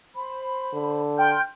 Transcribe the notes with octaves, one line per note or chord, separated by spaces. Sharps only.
C5 B5
D3
G5 C6 F6 G6